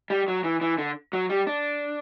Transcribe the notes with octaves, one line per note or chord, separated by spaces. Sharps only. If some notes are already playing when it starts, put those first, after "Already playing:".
G3
F#3
E3
E3
D3
F#3
G3
D4